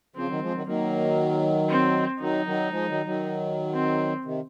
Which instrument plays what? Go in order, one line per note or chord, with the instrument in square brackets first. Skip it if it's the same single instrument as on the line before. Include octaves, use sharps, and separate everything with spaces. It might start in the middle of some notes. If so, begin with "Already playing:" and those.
[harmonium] C#3 F3 [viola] C4
[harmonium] D#3 F#3
F3 G#3
D#3 F#3
[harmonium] D#3 F#3 [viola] A#3
[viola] C4
[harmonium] D#3 F#3 [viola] D#4
[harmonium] D#3 F#3
F3 G#3
D#3 F#3
D#3 F#3
[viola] C4
[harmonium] C3 D#3